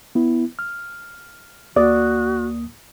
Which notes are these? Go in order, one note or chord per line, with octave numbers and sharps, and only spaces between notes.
B3 E4
F6
D2 A#3 F#4 D5 D#6